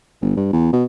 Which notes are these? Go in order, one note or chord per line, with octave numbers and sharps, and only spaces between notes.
G1
G2
E2
B2